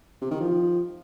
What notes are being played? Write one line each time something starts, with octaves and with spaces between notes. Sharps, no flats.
C3
D#3
F3